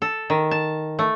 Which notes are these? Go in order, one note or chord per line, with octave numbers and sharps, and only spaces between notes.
A4
D#3
A5
A3